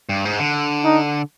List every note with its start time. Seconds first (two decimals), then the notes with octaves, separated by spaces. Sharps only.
0.09 G2
0.25 G#2
0.39 D3
0.85 D#4